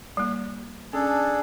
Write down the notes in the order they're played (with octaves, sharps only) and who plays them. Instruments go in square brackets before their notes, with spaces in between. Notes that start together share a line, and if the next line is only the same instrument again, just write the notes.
[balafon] G3 A#3
[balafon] C#4 [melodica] D4 G#4 A4